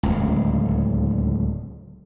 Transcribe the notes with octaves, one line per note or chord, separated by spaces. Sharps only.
D1 G1 C#2